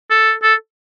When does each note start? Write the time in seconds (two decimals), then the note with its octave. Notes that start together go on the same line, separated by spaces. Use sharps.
0.10 A4
0.43 A4